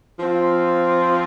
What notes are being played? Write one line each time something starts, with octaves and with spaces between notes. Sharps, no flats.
F3 C4 F4